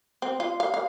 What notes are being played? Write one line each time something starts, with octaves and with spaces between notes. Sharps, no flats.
C4
F4
F5
F5